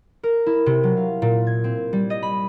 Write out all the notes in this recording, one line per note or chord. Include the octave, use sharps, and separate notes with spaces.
A#4
E4
C3
F#3
F5
A#2
G#6
C4
G3
D#5
B5